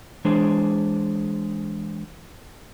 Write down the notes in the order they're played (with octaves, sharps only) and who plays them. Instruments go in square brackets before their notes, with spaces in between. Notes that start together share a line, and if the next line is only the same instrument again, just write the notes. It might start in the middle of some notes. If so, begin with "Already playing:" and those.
[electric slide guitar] E3 G#3 D4 G#4 C5 C#5